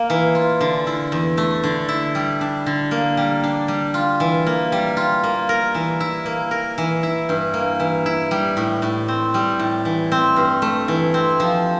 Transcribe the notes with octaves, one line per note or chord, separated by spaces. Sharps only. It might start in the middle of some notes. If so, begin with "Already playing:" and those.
Already playing: A#3
E3
F4
D3
E4
E2
A3
D3
E4
G3
D4
D3
A#3
G3
D4
G3
F4
E3
A#3
G3
F4
A#3
A#4
E3
E4
A#3
A#4
E3
E4
G2
A#3
E3
E4
G3
A2
A2
C4
G3
A2
E3
C4
G2
A3
E3
C4
F3